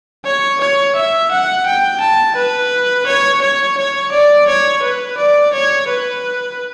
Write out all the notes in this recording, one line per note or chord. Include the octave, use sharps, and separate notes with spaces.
C#5
C#5
E5
F#5
G5
A5
B4
C#5
C#5
C#5
D5
C#5
B4
D5
C#5
B4